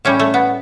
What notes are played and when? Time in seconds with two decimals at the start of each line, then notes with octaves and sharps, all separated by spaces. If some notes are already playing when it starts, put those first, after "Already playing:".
0.05 A2 G3 C#4
0.20 A3
0.34 B3